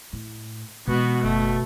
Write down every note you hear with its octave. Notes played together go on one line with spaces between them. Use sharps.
A2
B2 E3 G#3 B3 F#4
F#1 A3